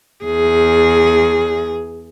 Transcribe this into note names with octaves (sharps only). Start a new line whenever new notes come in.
E2 G#4